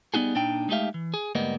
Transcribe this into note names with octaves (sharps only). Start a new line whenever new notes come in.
G3 B3 D#4 F#4 G#4
A#2 D4 D#4 G5
G#3 A3 D#4 G4 E5 F5
E3
G#4
D2 G#2 G3 A#3 B3 D#5